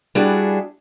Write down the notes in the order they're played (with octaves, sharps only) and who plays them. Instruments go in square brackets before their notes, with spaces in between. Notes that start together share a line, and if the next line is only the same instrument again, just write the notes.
[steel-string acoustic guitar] G3 D4 E4 F#4 G#4